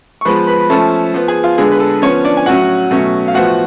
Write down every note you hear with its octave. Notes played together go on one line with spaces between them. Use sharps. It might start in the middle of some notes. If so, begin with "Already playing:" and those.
C#6
F3 G#3 B3 B4 B5
B4 B5
B5
F3 A3 C#4 A4 A5
F3 B3
G#4 G#5
F4 F5
D3 G#3 B3 G#4
B4
A4
F3 B3 C#4 C#5
D4 D5
G#5
A2 F#3 C#4 F#4 F#5
B2 F#3 A3 C#4
F5
A2 F3 B3 F#4 F#5